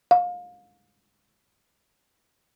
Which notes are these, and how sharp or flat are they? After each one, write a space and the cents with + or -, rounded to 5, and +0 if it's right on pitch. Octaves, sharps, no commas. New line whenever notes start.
F5 +30